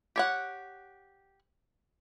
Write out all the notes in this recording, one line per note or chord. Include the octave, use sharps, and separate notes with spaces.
G4 C#5 F#5